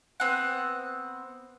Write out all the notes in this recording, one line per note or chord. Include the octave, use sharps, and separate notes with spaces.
B3 C4 F#5